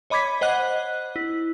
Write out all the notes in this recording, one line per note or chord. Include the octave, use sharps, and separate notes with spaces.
C#5 D#5 B5 D6 G#6 B6
C5 D#5 F#5 F#6
E4